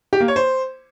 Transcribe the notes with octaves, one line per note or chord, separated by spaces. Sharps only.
G4
A#3
C#5
C5